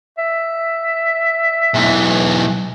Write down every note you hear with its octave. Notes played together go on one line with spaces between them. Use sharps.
E5
B1 E3